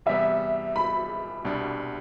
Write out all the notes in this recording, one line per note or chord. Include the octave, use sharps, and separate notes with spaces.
E2 C3 G3 B3 E5
B5
C2 B2 G3 D4